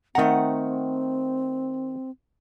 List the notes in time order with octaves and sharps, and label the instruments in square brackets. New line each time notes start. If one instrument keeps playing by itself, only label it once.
[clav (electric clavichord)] D#3 A#5 [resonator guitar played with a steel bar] A3 F#5 [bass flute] C4